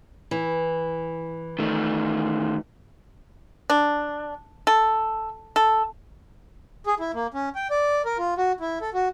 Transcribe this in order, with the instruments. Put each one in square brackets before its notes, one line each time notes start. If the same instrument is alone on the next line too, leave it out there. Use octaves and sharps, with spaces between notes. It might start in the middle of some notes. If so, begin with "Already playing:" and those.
[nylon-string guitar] E3
[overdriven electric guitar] D#3 A3
[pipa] D4
A4
A4
[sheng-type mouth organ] G#4
E4
A#3
C#4
G5
D5
A#4
F4
F#4
E4
A4
F#4